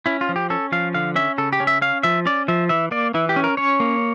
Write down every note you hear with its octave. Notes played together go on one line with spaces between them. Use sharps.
C#4 E4
F4
F3
G4
C#4 A4
F3 F5
D3 F5
C#4 E5
C#3 A4
G4
C#4
E5
C#4 F5
F3 E5
C#4 D5
F3 E5
E3 E5
A#3 D5
E3 E4
G4
C#4
A#4
C#4 C#5
A#3